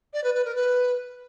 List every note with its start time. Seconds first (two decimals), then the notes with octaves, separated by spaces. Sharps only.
0.14 D5
0.24 B4
0.35 B4
0.45 A#4
0.55 B4